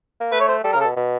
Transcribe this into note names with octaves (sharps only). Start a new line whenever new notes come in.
A#3
A3 B4
C#5
C5
G3 A4
A#4
C#3 A4
B2
B2